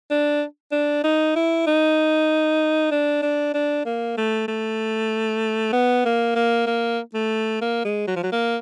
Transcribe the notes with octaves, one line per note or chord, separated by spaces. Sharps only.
D4
D4
D#4
E4
D#4
D4
D4
D4
A#3
A3
A3
B3
A#3
A#3
A#3
A3
A#3
G#3
F#3
F3
F#3
A#3